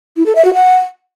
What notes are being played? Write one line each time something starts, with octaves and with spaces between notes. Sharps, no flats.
E4
A4
E5
F#4
F#5